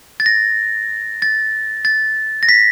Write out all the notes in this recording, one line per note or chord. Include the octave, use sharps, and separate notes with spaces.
A6
A#6
A6
A6
A#6
B6